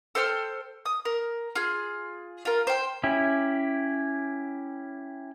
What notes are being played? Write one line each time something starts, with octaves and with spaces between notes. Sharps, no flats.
A4 C5 G5 F6
D#6
A#4
F4 G#4
F4 A#4
C5 G5
C#4 E4 G4